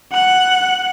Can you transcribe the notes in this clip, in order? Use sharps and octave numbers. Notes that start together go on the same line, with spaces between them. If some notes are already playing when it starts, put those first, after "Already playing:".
F#5 F#6